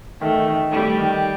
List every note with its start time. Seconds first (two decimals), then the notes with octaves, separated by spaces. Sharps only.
0.21 D#3 A3
0.48 D#3
0.72 G3 A3
0.98 D#3